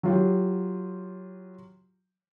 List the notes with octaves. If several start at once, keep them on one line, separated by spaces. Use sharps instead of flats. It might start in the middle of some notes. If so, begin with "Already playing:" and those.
F#3 F4 G4